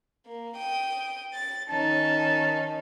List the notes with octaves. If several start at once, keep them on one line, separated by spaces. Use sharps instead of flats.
A#3
G5 D#6
A6
D#3 C#4 D#4 A5